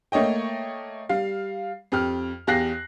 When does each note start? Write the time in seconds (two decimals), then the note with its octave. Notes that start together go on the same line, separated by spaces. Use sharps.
0.12 A3 A#3 C#5 D#5 G5
1.09 G3 F5
1.92 F2 G4 F6
2.47 E2 G4 F5 F#6 A#6 C7